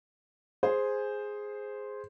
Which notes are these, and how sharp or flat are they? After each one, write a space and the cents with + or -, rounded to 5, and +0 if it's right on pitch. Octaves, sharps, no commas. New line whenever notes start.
G#4 +0 C5 +0 G#5 +0